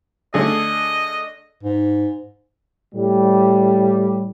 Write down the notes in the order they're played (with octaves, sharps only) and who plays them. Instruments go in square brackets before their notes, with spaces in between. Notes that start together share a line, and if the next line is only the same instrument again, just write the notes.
[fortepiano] D3 A3 G#4 [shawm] D#5
[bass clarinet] G#2
[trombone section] A2 G3